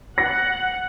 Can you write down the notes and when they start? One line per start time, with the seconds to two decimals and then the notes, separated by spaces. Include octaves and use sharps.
0.18 F#5 A#6